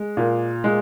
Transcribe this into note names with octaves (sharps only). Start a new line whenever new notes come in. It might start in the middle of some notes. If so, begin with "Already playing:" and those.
Already playing: G#3
A#2
G#3